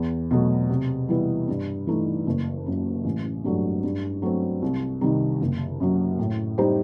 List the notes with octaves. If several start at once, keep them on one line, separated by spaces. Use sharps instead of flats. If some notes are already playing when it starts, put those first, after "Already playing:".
Already playing: E2
B2 F#3 A3
C3
E3 G3 B3 E4
G2
E3 A3 D#4
F#1
F#2 F#3
A1
G2 F#3 A3
G2
F#3 A3 C4
C2
C3 D#3 G3 D#4
F#1
F#2 F#3
A2
G3 D#4 G4 C5